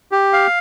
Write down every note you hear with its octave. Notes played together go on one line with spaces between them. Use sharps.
G4
F5